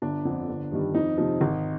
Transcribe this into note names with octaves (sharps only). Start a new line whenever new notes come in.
G1 D4
F2 D3
G1
G2 D#3 G3
F2 D#4
C3 F3
G#1